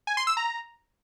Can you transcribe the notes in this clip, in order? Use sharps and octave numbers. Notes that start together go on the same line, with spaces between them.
G#5
C6
E6
A#5